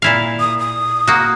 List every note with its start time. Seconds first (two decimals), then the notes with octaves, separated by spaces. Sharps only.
0.02 A#2 E4 F5
0.40 D#6
0.59 D#6
1.07 A#3 F#4